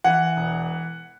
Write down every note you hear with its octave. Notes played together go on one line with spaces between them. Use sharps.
E3 F#5
E1